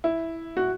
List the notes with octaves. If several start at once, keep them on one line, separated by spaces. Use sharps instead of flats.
E4
F#4